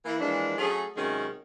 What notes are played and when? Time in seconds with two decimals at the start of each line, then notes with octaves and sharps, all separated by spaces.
0.05 E3 A#3 E4
0.19 E3 F3 G#3 A#3 D4
0.58 F#3 A3 C#4 G#4
0.96 C3 D#3 F#3 G#3 C#4 G#4